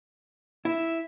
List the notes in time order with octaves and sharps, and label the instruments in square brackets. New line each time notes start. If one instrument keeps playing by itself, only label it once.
[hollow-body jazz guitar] E4 [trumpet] E5